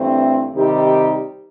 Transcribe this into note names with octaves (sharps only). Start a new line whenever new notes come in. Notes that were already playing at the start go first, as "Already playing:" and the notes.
Already playing: G2 E3 A3 C4
C3 D#3 G3 D#4 G4